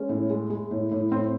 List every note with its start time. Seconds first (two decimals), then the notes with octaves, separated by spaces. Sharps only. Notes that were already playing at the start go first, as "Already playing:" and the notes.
Already playing: G#3 C#4
0.09 A2
0.30 G#3
0.50 G#3
0.71 A2
0.91 A2
1.12 A2 C4